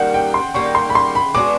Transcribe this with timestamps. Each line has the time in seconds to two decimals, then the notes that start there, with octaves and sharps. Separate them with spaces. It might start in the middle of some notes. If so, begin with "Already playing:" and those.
Already playing: D#3 G3 A#3 F#5
0.14 G5
0.34 C6
0.54 D#3 G3 A#3 C#6
0.75 C6
0.90 B5
0.95 C6
1.15 B5
1.34 G#3 B3 D4 F#4 D6